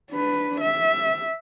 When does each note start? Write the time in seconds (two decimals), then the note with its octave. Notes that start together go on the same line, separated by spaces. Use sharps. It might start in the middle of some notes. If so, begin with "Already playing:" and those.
0.12 D4 B4
0.61 E5